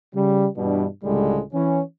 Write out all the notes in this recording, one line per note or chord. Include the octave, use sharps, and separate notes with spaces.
C#3 G3
G2 B2 E3 G3 D4
C#2 A2 D3 G3 G#3
E3 C#4